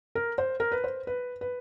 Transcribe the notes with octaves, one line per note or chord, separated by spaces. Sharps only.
A#4
C5
A#4
B4
C5
B4
B4